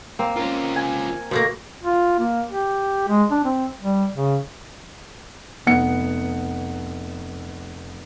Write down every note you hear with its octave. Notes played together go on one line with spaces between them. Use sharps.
A#3 C4
C#4 F4 A#4
G#5
B2 F3 A3 A#3
F4
A#3
G4
G#3
D4
C4
G3
C#3
F1 B3 F#5 C#7